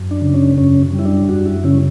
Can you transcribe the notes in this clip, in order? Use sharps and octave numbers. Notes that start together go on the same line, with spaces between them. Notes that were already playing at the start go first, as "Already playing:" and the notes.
Already playing: F#2
D4
C#3
C#4
F#2 C#4
G3
E4
D4
F#2 F#4
E4
C#3 C#4